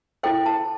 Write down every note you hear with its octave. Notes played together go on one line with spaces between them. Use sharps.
E4 A4 C5 G5
A5